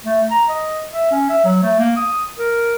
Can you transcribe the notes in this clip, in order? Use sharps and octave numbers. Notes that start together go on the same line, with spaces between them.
A3
A#5
D#5
E5
C#4
E5
F#3
A3
A#3
D#6
A#4